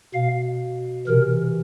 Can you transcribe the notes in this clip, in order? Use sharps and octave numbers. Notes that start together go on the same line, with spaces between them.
B2 F5
C3 E3 A#4